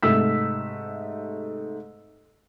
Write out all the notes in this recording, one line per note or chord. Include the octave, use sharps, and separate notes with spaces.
G#2 C3 A3 E6 B6